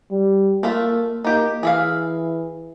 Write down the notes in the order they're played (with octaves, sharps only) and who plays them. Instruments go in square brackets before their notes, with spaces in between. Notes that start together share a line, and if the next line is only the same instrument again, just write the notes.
[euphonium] G3
[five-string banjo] A3 F4 E5 [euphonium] A#3
[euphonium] A#3 [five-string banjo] D#4 G4
[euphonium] E3 [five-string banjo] G#4 E5 F5